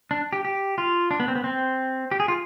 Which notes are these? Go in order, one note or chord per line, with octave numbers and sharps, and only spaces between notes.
D4
G4
G4
F4
D4
B3
C4
B3
C4
G4
G#4
F4